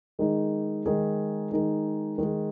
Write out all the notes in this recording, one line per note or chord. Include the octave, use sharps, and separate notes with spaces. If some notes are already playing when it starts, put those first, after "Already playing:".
D#3 G#3 D#4 G#4
D#3 G#3 D#4 G#4
D#3 G#3 D#4 G#4
D#3 G#3 D#4 G#4